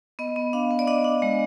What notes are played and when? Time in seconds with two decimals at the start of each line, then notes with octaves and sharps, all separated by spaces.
0.19 B3 D#5
0.36 B3
0.53 D4 F5
0.71 B3
0.79 D5
0.87 D4 D#5
1.04 D4
1.22 G#3